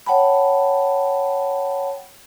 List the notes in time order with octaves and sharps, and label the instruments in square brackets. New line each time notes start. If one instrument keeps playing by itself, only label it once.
[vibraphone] C#5 F#5 G5 A5 B5